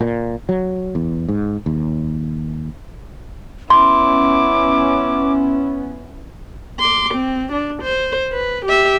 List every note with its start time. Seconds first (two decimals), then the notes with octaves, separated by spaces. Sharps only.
0.01 A#2
0.49 F#3
0.95 E2
1.29 G#2
1.66 D#2
3.70 B3 C#4 E4 C6 D6
6.79 C6 D6
7.14 C4
7.52 D4
7.82 C5
8.32 B4
8.65 G4 E5